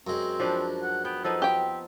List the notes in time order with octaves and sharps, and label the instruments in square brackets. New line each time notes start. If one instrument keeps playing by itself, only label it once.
[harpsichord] F#2 G#3 [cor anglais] C4
[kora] F3 D4 B4
[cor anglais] F#5
[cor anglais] B3 [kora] G5
[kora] F3 B3 D#4 [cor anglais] A4
[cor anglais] C4 [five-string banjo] G4 G5